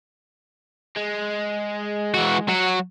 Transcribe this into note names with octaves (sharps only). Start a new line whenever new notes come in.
G#3
E3 F#4
F#3 F#4